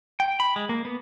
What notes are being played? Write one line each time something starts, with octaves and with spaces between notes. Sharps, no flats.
G5
B5
G#3
A#3
B3